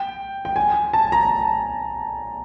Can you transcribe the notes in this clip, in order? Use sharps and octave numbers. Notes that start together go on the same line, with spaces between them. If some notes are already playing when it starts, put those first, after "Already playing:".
Already playing: G5
G5
G#5
A5
A#5